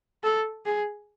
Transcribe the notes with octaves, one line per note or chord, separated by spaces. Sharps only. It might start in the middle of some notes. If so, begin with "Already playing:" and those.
A4
G#4